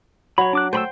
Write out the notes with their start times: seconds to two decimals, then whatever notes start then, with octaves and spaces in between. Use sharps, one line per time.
0.38 F#3 C#5 B5
0.53 D4 D6 F#6
0.73 A3 C5 G5 B5 E6